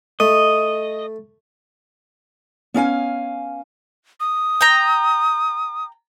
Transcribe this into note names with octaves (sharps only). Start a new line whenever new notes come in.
A3 D#5
B3 C#4 F5 G#5
D#6
G5 A#5